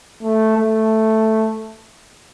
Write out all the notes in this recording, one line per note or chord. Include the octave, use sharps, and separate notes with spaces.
A3
A3